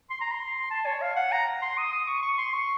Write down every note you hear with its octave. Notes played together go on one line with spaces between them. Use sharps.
C6
A#5
C6
A5
C#5
F5
F#5
A#5
C6
D#6
D#6
C#6
C#6
C6
C#6